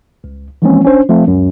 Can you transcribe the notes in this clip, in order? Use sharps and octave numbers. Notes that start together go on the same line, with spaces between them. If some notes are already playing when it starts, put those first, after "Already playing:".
C#2
E3 F3 G#3 A#3 C4 C#4
C#4 D4 C5
F3 A3 C4
C#2 F#2